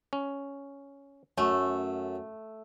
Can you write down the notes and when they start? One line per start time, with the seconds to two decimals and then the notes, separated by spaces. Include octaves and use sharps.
0.13 C#4
1.38 F#2 A3 C#4